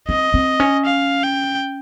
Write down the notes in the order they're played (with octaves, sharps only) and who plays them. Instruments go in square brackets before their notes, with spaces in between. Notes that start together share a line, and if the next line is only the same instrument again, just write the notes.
[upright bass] C4 [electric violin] D#5
[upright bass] C4
C#4
[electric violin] F5
G5